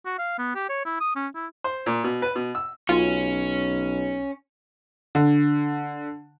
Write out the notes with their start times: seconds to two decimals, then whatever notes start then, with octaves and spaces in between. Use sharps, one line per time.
0.06 F#4
0.19 F5
0.39 B3
0.55 G4
0.69 C#5
0.85 E4
1.01 D#6
1.16 C#4
1.35 E4
1.64 C5
1.86 A#2
2.04 B2
2.22 B4
2.35 B2
2.55 E6
2.89 B1 C#4 F4
5.15 D3